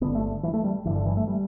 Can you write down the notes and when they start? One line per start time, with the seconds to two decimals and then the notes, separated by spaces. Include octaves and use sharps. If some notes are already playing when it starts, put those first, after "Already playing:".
0.01 G1 G2 D3 B3
0.15 A3
0.43 E3
0.54 A3
0.64 G3
0.85 G1 G2 D3 E3
0.96 D3
1.06 E3
1.17 A3
1.27 G3